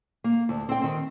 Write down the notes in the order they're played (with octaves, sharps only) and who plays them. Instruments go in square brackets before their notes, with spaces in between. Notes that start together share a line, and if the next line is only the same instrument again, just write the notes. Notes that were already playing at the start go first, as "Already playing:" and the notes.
[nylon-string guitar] A#3
D2
C4 G5
D#3 C4